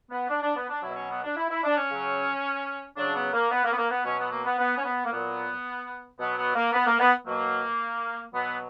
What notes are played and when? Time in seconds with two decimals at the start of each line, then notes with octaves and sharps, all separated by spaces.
0.11 B3
0.29 D4
0.42 D4
0.56 B3
0.69 D4
0.83 B2 F#3 E4
0.96 C#4
1.10 B3
1.23 D4
1.37 E4
1.50 E4
1.64 D4
1.76 C#4
1.90 C#3 F#3
2.97 C#3 F#3 D4
3.15 B3
3.33 A#3
3.51 B3
3.64 A#3
3.72 B3
3.78 A#3
3.91 B3
4.04 B2 F#3 C#4
4.18 B3
4.31 A#3
4.45 B3
4.58 B3
4.78 C#4
4.85 B3
5.05 A#3
5.12 A#2 F#3 B3
6.19 B2 F#3 B3
6.37 B3
6.55 A#3
6.73 B3
6.86 A#3
6.99 B3
7.26 B2 F#3 A#3
8.34 B2 F#3 B3